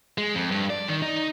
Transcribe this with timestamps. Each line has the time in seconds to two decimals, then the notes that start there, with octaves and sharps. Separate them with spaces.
0.18 G#3
0.35 F2
0.51 G2
0.70 D5
0.88 D#3
1.02 D#4